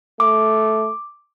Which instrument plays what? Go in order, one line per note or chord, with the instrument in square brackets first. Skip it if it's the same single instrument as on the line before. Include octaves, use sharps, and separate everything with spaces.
[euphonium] A3 [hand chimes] D6